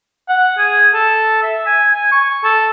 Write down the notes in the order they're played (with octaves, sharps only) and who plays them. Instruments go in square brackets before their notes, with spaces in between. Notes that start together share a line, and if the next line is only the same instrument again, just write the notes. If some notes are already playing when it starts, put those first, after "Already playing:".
[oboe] F#5
G#4
A4
E5
G#5
G#5
C#6
A4